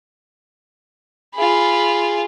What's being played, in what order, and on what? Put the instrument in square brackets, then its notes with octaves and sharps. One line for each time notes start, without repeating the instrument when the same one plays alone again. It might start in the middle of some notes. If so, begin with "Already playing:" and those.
[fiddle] F4 G#4 [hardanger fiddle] B5